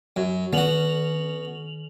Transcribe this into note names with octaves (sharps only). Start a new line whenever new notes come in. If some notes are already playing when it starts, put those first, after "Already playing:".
F#2
D#3 B3 F#4 F7 F#7